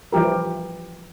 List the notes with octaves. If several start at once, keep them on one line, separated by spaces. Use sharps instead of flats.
E3 F3 G3 G4 A#4